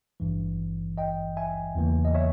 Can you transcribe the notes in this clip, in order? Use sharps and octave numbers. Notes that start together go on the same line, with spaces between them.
G#1 G2 E3
D#5 G5
E5 G#5
E2 C#3 E3 A#3
D#5
C#5 E5